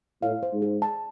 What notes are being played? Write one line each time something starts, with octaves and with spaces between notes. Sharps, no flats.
A2 F5
C5
G#2
G#4
A5